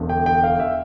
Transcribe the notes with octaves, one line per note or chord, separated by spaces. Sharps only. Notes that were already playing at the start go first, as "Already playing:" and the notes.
Already playing: E1 E2 D3
G5
G5
F5
E5